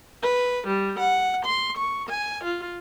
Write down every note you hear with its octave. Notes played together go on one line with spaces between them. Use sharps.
B4
G3
F#5
C6
C#6
G#5
F4